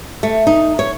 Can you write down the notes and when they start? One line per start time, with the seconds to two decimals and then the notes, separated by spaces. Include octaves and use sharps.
0.23 A3
0.47 D#4
0.79 C#5